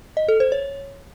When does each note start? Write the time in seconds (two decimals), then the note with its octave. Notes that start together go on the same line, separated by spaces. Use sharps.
0.17 D#5
0.28 A4
0.40 C5
0.52 C#5